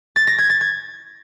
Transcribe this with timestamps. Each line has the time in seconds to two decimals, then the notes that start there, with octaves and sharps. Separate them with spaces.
0.16 A6
0.27 A#6
0.38 G#6
0.50 A6
0.61 G#6